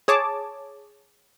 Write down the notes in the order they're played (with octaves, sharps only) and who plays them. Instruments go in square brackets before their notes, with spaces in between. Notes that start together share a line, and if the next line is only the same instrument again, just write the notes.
[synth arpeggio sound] G#4 C#5 A5 D6